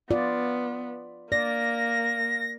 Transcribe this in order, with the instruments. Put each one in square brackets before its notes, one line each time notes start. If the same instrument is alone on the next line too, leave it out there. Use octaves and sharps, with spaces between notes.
[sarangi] B3 [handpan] F4 D5
[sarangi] A#3 [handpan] D5 [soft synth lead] A#6